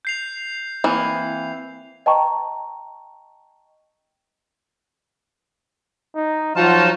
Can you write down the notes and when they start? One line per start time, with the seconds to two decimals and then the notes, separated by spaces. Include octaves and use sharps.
0.05 G6 C7 F7
0.84 E3 A#3 C4
2.06 D#5 G5 A5 A#5 C#6
6.15 D#4
6.56 F3 F#3 D#4 F4 F#4 A5